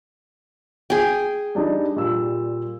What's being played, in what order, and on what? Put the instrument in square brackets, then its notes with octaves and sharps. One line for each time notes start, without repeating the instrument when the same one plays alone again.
[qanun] G#4 G5
[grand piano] G3 D4 D#4
A#2 G3 E6